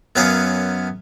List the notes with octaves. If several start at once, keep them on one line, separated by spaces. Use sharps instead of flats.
F#2 B3 C#4 A#4 F5 D#6